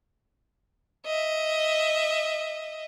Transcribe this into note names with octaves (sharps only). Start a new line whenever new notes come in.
D#5 E5